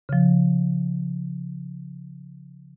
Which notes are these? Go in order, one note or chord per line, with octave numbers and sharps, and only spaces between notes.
C#3 F3